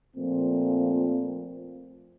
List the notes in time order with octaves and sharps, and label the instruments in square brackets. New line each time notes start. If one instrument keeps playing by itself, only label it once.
[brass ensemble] A#2 F3 A3 C4